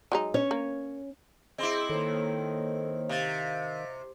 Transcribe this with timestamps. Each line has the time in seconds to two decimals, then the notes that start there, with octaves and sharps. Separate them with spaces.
0.12 F#3 G#3 D#4
0.34 C#4 C#5
0.51 A#3
1.58 C4 E4 G#4 D#5 C6 D6
1.90 D#3 A#3 A4 C5 C#5
3.09 C3 D#5 F5 A6